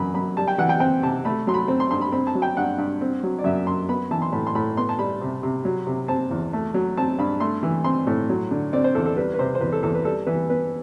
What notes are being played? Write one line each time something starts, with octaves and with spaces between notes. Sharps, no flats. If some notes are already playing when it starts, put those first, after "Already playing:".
Already playing: F#2 E3 B5
F#2 B5
G3 A5
G5
E3 F#5
G5
C4 G5
C3 A5
A3 B5
F#3 C6
B5
C4
C6
G2 C6
B5
C4 B5
A5
F#3
G5
G2 F#5
G2
C4
F#3
D5
F#2 E5
F#2 C6
B3 B5
E3 A5
C6
A2 B5
C6
A2 B5
B3 C6
A5
G3 B5
C3
C3
F#3
C3
C4 A5
E2
A3
F#3
C4 A5
G2 B5
A3 C6
E3
C4 C6
A2
F#3
D3
C4 D5
C5
E2 A4
A4
G3 B4
B4
C3 C5
C5
E2 B4
A4
E2 A4
B4
G3 A4
E3 B4
B3 B4